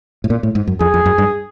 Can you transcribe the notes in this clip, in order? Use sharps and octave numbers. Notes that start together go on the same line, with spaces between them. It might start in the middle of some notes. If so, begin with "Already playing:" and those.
A2
A#2
A2
G#2
F#2
F2 G#4
F2
F#2
G2